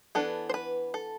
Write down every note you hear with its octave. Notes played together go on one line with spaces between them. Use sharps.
E3 B3 D4 A4
C5
B4
A4